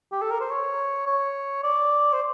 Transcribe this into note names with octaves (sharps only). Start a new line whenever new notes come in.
G4
A4
A#4
C5
C#5
C#5
D5
C5